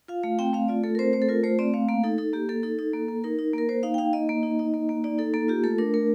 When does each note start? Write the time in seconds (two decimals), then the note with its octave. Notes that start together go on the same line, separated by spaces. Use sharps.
0.08 F4 F5
0.23 A3 F5
0.39 C4 G5
0.53 A3 F5
0.68 F4 D5
0.83 A3 A4
0.95 A#4
0.99 C4 C5
1.13 A3 C5
1.22 A4
1.29 F4 A#4
1.43 A3 C5
1.59 C4 D5
1.74 A3 F5
1.89 A#3 F5
2.04 D#4 A4
2.18 D#4 A4
2.33 A#3 G4
2.49 A#3 A4
2.63 D#4 A4
2.79 D#4
2.93 A#3
3.08 A#3
3.24 D#4 A#4
3.39 D#4
3.53 A#3 A#4
3.69 A#3 C5
3.83 D#4 F5
3.94 G5
3.98 D#4 F5
4.13 A#3 D#5
4.29 A#3
4.43 D#4
4.59 D#4
4.74 A#3
4.89 A#3
5.04 D#4 D5
5.18 D#4 A4
5.34 A#3 A4
5.48 F4 G4
5.64 A3 A4
5.78 D4 A#4
5.94 A3 A#4